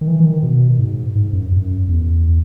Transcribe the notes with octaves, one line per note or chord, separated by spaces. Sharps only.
D#3
E3
E3
D#3
B2
G#2
G#2
F#2
F#2
E2